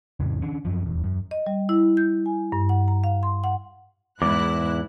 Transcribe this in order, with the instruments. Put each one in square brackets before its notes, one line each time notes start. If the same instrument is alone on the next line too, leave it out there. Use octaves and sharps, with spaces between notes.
[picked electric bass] F2 A2 C#3
D#3 C#4 D4
F#2 F3
D#1 E2
F#2
[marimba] D#5
G3
E4
G6
G#5
G2
F#5
A#5
F5
C6
F#5
[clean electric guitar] E2 [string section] G#2 E4 F#6 [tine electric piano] D6